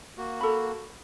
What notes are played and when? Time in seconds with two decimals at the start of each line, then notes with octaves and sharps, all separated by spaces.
0.18 A#3 F#4
0.41 A4 B5